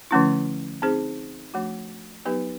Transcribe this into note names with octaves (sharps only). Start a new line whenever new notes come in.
D3 F3 A3 C#4 E4
C4 D#4 G#4 C5
F3 A3 D4 F#4
F#3 B3 D#4 G4 B4